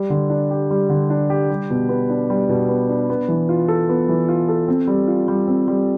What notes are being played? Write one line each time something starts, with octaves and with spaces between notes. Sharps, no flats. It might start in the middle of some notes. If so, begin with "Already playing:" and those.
Already playing: G3
D3
D4
G4
G3
D3
D4
G4
G3
B2
B3
D4
G3
B2
B3
D4
B3
E3
F4
A4
B3
E3
F4
A4
C4
G3
F4
G3
C4
G3